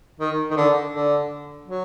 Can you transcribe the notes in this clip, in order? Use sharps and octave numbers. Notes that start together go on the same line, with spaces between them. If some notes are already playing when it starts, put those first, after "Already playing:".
D#3
D#3
D3
D3
F#3